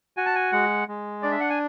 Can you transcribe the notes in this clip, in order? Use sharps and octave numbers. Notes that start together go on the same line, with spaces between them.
F#4 G#5
A5
G#5
G#3 F#5
G#3
D4 D5
E5
F#5
G#5